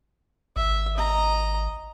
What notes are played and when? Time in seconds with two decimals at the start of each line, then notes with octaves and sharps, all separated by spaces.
0.56 G#1 E5
0.97 D#5 A#5